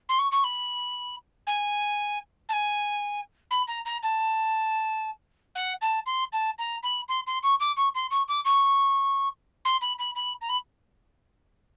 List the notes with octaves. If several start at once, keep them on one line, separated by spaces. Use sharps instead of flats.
C6
C#6
C#6
B5
G#5
A5
G#5
B5
A#5
A#5
A5
F#5
A5
C6
A5
A#5
B5
C6
C6
C#6
D6
C#6
C6
C#6
D6
C#6
C6
B5
B5
B5
A#5
B5